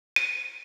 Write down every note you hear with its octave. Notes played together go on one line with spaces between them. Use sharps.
D#7